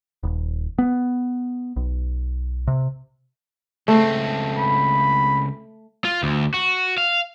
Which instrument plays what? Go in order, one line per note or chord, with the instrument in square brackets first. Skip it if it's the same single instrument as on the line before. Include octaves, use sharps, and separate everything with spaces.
[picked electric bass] D#1
B3
B1
C3
[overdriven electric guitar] C#2 C4 [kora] A3
[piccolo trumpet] B5
[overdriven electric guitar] F4
D2
F#4
F5